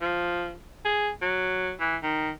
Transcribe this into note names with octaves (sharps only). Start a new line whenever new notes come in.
F3
G#4
F#3
E3
D#3